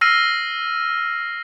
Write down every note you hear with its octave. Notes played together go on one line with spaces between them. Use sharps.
E6 F6 A#6 C7 D#7